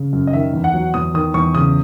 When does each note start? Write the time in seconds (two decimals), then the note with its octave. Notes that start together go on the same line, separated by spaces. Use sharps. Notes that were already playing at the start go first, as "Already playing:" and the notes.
Already playing: C#3
0.13 F#2
0.27 D#5
0.33 D#3 E5
0.53 E2
0.64 F#5
0.74 F#3
0.94 E2 D#6
1.14 D#3 D#6
1.34 E2 C#6
1.55 C#3 D#6